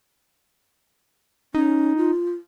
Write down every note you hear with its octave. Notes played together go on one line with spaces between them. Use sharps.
C#4 D#4
F4